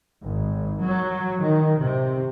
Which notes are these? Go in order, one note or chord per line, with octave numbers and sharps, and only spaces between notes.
G#1
F#3
D#3
C3